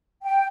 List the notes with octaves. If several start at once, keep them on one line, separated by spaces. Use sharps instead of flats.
G5